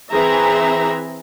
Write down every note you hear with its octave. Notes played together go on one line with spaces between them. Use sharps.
E3 C4 G#4 E5 A#5